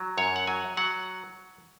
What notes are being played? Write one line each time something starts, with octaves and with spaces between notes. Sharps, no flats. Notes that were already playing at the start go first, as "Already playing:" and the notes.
Already playing: F#3
F#2 C#5
F#5
F#3 G#5
F#3 F#5